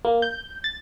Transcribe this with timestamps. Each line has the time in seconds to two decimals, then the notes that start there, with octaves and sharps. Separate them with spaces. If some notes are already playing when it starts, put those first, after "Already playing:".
0.05 A#3
0.22 G6
0.64 A6